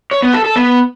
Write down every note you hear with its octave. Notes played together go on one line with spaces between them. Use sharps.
C#5
B3
A4
A4
B3